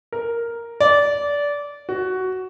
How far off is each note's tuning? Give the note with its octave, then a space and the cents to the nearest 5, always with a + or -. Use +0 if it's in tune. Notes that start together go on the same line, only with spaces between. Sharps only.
A#4 +0
D5 -20
F#4 +10